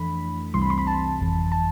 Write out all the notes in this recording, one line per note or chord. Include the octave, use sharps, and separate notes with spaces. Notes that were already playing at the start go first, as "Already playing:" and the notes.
Already playing: F2 E3 A3 D4 B5
C2 C3 E3 G3 C4 C6
B5
C6
B5
A5
G1 F2 E3
A5